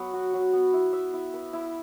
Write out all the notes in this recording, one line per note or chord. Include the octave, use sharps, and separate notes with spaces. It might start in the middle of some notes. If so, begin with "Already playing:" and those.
Already playing: F#3 B3
F#4
F#3
B3
E4
E5
E4
B4
E4